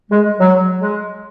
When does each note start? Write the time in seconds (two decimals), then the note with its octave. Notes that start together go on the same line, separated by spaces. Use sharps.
0.11 G#3
0.39 F#3
0.81 G#3